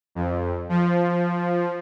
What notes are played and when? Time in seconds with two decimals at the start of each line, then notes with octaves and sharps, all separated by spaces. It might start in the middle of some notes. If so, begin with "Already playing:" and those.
0.15 F2
0.69 F3